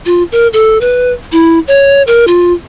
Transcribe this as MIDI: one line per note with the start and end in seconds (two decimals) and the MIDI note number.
0.06 0.23 65
0.32 0.47 70
0.53 0.78 69
0.81 1.12 71
1.32 1.59 64
1.68 2.02 73
2.07 2.25 70
2.28 2.53 65